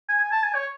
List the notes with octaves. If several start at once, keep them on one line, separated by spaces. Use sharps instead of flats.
G#5
G#5
A5
G#5
C#5